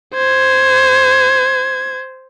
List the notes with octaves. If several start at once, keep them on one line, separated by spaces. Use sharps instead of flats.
C5 G#6